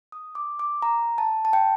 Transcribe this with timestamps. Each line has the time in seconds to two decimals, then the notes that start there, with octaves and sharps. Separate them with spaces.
0.12 D#6
0.35 D6
0.59 D6
0.82 A#5
1.18 A5
1.45 A5
1.53 G5